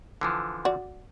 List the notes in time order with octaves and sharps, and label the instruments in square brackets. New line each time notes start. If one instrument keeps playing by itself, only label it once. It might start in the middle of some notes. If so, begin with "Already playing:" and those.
[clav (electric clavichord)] D3 E3 F3
[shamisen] F#4 D5